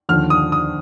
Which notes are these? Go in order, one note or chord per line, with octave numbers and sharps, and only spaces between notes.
D#2 D3 F3 F6
D#6
D#6